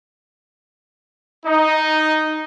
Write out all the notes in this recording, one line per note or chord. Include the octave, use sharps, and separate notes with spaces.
D#4